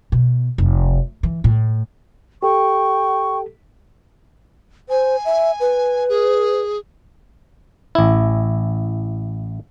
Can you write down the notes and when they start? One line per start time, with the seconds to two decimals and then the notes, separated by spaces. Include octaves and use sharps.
0.12 B2
0.58 F1
1.23 E3
1.44 A2
2.43 G4 A4 G5 C#6
4.89 C5 G#5
5.25 E5
5.60 B4
6.09 G#4
7.95 A1 E4